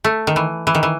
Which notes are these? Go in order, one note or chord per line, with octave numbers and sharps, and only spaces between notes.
A3
D#3
E3
E3
D#3
E3